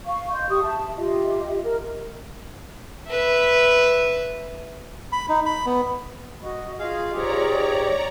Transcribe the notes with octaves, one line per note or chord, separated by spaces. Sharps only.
F5 C#6
D#5 C6 G6
G4 C#6 D#6
E5 A5
F4 G4 D#5 E5
A#4
B4 E5
B5
D#4
B5
B3
F#4 D#5
F4 G#4 D#5 F5
G#2 G4 G#4 C#5 D5 A#5